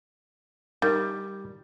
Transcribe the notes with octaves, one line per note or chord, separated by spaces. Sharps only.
D#3 G3